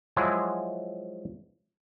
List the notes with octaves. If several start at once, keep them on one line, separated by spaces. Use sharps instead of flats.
F3 F#3 G#3 E4 G#4